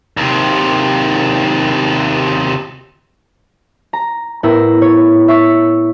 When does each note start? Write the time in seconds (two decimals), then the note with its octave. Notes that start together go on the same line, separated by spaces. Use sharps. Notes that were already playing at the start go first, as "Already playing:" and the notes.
0.17 D#2 C3
3.93 A#5
4.43 A2 B3 E4 A#4 A#5 E6
4.82 C#5
5.28 E5 C#6 E6